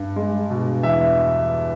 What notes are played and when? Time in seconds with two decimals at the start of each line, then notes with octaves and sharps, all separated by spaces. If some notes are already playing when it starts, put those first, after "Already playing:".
Already playing: G2
0.16 G#3
0.50 B2
0.83 E2 E5